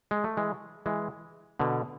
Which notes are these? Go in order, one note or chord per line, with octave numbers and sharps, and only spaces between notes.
G#3
A3
E3 G#3
E3 G#3
B2 D3